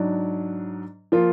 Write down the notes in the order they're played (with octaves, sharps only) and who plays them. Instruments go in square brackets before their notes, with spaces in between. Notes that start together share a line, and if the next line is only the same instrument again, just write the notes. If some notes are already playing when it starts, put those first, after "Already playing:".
Already playing: [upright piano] G#2 F#3 D4
F3 A#3 F4